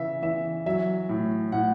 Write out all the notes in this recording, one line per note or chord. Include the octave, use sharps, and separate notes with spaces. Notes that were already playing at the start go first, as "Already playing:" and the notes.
Already playing: C#3 E3 E5
E3 E5
F#3 E5
A2
A2 F#5